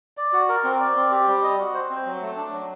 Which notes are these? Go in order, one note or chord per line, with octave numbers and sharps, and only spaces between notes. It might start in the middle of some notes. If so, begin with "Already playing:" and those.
D5
F#4
A#4
C4
D5
C4
G4
G3
D#5
F#4
C5
C4
F#3
A3
D4
F#3